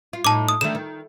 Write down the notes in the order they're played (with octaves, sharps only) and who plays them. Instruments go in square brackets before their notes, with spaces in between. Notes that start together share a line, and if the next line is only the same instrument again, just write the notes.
[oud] F4
[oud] A2 D#4 [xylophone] A5 D6
[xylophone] D#6
[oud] D3 D#3 A3 [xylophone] E7
[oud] D#3